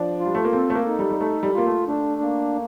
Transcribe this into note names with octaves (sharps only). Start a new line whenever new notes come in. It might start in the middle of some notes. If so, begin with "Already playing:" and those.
Already playing: F3 D4
F4
G3
A3
A#3
C4 A4
A3
A#3
D#4
G3
G3
A3 A4
G3
A#3 F4
A3
A3 D4
A#3